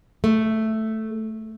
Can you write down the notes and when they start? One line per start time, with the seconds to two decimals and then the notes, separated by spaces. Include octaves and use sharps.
0.24 A3